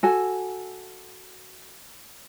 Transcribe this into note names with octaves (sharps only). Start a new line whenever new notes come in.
F#4 A4 G#5